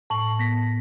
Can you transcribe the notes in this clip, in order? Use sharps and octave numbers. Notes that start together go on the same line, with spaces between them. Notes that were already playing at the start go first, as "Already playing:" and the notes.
A2 A5 C#6 F#7
B3 A#6 B6